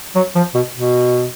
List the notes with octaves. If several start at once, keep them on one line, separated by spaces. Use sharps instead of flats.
F#3
F3
B2
B2